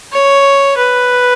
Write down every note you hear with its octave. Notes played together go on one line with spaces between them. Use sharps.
C#5
B4